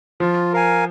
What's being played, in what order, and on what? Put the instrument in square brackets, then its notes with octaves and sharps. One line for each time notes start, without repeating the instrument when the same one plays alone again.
[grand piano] F3 [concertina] F4
[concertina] A#4 F5 G#5